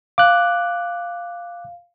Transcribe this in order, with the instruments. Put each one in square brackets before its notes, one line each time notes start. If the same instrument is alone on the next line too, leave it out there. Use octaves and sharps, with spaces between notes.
[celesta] F5 [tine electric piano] D6 F#6